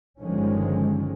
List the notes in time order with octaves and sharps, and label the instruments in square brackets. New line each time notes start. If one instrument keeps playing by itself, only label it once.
[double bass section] G1 D3 D#3 F3 G#3 C#4